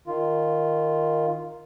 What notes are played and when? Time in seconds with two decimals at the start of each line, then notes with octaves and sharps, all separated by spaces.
0.07 D#3 F4